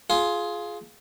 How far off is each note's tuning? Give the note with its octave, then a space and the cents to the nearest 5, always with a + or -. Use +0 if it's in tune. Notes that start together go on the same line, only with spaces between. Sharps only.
F4 +0 G#4 +15